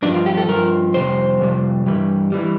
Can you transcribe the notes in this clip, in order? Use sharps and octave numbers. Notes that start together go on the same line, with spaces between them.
G2 F3 D4
F4
G4
A4
G2 F3 A#4
F2 C3 G3 C5
F2 C3 G3
G2 E3 G3
E3 G3